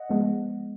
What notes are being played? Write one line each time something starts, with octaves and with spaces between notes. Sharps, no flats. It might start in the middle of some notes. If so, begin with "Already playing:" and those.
Already playing: D#5 F#5
F3 G#3 B3